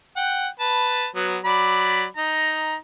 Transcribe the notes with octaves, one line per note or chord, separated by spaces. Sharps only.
F#5 G5
B4 A5
F#3 B3
F#3 D5 B5
D#4 A#5